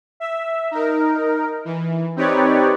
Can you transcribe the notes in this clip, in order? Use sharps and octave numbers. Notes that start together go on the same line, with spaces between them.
E5
D#4 A#4
E3
C4 D#4 G4 B4 C#5 D5